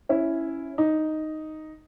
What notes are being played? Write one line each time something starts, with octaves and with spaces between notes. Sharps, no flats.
C#4 E4
D#4